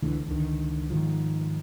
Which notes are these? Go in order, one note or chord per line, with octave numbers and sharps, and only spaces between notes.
C#2 D3 E3 A3
C#2 D3 D#3
G#2 D#3 F3